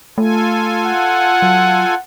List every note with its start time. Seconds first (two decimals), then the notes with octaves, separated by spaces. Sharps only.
0.18 A3 F4 A4 G#5
0.86 F#5
1.42 F#3